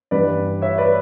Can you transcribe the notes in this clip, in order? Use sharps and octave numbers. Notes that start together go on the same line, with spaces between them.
G2 E3 G3 B4 D5
C#5 E5
B4 D5